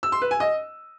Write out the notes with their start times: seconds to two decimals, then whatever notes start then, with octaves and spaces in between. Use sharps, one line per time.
0.03 E6
0.12 C6
0.22 B4
0.31 G#5
0.40 D#5